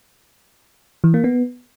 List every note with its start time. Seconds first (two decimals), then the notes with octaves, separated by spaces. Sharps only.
1.04 E3
1.14 A#3
1.24 B3